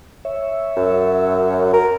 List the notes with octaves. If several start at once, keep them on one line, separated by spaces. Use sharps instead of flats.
C#5 E5
F#2
A#4